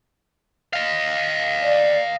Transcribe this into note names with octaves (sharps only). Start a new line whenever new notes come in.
D#5 F5
D5